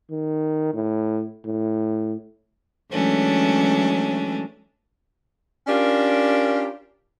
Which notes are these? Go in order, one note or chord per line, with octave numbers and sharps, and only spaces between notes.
D#3
A2
A2
E3 F#3 G#3 A3 C#4 D4
C#4 D4 F4 G4 A#4